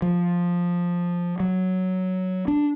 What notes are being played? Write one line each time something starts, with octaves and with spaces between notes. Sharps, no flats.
F3
F#3
D4